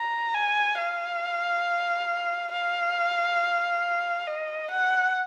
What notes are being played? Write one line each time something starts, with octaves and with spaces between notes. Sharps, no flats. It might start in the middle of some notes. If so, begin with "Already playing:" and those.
Already playing: A#5
G#5
F5
F5
D#5
F#5